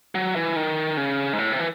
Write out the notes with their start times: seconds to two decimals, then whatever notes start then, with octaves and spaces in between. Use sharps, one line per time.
0.15 F#3
0.36 E3
0.56 D#3
0.97 C#3
1.33 G#2
1.38 A2
1.52 C3
1.59 E3